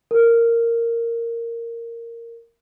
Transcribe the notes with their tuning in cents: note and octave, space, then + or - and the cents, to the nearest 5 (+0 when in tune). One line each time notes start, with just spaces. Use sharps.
A#4 -10